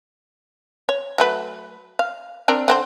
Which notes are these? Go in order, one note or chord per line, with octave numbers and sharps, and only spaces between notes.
C#5
F#3 A3 B4
F5
C4 D4 A#4
D3 C4 C5